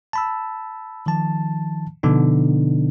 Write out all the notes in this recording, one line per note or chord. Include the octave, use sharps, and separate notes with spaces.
A5 B5 E6
D#3 F3 A5
B2 D3 F3 B3 D4 D#4